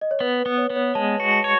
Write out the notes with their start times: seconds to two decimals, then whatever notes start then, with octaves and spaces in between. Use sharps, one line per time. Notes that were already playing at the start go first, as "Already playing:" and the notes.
0.01 D#5
0.11 C#5
0.20 B3 B4
0.39 B4
0.46 B3
0.58 C#5
0.70 B3
0.76 C#5
0.95 G#3 A5
1.20 F#4
1.32 A5
1.44 C#5